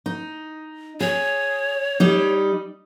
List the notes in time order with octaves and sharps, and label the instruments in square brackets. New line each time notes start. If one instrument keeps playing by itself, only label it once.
[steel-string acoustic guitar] D#4
[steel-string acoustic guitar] G#4 [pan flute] C#5
[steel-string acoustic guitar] G3 D#4